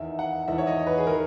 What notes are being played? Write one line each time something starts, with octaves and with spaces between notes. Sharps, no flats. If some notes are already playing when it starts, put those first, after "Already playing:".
Already playing: E2 D#3 E5
F#5
E2 D#3 E5
C#5
D#5
B4
G#4
D#3 A#4